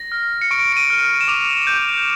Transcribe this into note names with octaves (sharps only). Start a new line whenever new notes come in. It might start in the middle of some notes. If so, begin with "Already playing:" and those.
Already playing: A#6
F6
C#7
C#6 D7
D7
D#7
F6
E7
D6 F7
G6